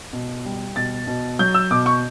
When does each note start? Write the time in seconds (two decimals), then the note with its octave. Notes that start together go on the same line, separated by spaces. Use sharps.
0.13 B2
0.45 G3
0.76 B2 A6
1.07 B2
1.39 F#3 G6
1.54 E6
1.71 B2 D6
1.86 C#6